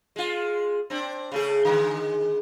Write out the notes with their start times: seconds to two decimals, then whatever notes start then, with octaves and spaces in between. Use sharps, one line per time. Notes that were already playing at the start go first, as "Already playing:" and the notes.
0.16 G#3 F4
0.90 C4 D4
1.32 C#3 A3 G#4
1.65 D3 D#3 G#3